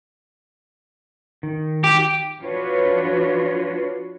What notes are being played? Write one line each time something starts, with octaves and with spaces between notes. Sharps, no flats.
D#3
G4
F3 D4 F4 F#4 B4 C#5